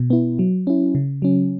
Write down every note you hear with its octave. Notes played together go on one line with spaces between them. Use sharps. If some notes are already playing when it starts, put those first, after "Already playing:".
Already playing: B2
B3 E4
F#3
C#4 E4
C#3
F#3 C#4